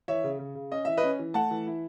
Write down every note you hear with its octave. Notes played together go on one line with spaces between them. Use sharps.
E3 C#5 E5
C#3
C#3
C#3
C#4 D#5
E3 E5
B4 D#5
C#4
E3
A3 F#5 A5
E3
E4